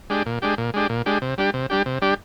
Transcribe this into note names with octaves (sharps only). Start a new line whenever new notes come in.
G#3 D4 G4
A#2
G#3 D4 G4
A#2
G#3 D4 G4
A#2
G#3 D4 G4
C3
G3 D4 G4
C3
G3 D4 G4
C3
G3 D4 G4